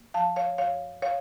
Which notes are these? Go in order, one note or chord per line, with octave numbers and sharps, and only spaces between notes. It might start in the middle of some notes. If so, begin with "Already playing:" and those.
Already playing: A#3
F3 F5 A5
C#5 F5
F#2 C#5 F5
C#5 F5